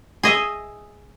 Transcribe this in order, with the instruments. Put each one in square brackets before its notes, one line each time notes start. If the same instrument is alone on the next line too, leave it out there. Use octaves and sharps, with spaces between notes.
[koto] G#4 D#5 E5